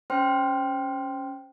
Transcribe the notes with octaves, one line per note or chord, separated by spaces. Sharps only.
C#4 C5 G5 C6 F6